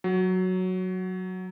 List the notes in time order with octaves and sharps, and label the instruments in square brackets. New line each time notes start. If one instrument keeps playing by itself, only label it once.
[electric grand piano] F#3